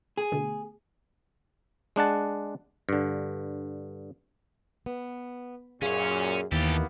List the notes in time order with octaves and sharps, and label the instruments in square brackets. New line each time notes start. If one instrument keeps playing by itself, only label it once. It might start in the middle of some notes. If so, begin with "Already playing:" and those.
[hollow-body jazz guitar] G#4
[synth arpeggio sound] B2 D3 A3
[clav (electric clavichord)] G#3 D4 F#5 A5
G2 D3
[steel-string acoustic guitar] B3
[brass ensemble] F#2 A#2 [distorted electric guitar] C#4 C#5 [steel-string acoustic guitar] G#4 F5
[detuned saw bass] D#2 [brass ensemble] E3 A#3 B3 [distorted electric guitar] G4 A4